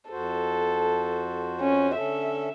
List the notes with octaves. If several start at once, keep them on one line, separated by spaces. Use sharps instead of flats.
F2 F#4 A4 C5
C#4
D3 C#4 A4 E5